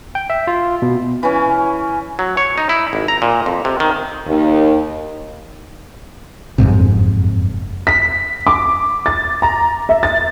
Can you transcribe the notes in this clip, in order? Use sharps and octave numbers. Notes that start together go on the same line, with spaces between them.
G5
E5
F4
B2
E3 C#4
F#3
C#5
D#4
E4
G#1
A#5
A#2
F2
C3
D#3
D#2
F#1 F2 G#2 C3
B6
D6
A6
A#5
E5
A6